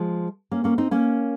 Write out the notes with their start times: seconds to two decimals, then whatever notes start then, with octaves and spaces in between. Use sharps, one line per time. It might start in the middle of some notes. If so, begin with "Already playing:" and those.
Already playing: F3 G#3
0.51 A#3 C#4
0.64 A#3 C#4
0.78 C4 D#4
0.91 A#3 C#4